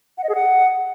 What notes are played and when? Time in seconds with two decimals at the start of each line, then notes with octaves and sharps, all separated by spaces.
0.18 F#5
0.24 D#5
0.29 G#4
0.35 F#5